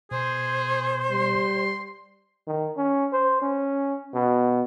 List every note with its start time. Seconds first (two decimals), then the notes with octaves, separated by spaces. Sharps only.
0.11 B2 G#4 C5
1.11 G3 C6
2.47 D#3
2.77 C#4
3.13 C5
3.42 C#4
4.14 B2